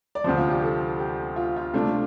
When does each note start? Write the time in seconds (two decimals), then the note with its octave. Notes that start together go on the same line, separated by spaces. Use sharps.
0.15 D5
0.24 D2 C3 F3 C5
0.37 F4
0.50 G4
0.62 A4
0.99 G4
1.36 F4
1.57 F4
1.73 C3 A3 D4 F4